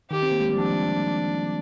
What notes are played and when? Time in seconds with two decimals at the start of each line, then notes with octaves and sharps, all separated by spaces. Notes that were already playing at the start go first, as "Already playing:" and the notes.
0.10 D#3 G4
0.23 C4
0.32 A#3
0.40 G#3
0.49 G3
0.57 F3 D4